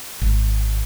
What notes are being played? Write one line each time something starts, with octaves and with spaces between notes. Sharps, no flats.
G#1